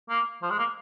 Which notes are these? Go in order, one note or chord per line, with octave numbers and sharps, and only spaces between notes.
A#3
F3
G#3
A#3